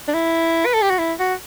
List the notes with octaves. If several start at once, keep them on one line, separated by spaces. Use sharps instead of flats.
D4
E4
B4
A4
G4
F#4
E4
F#4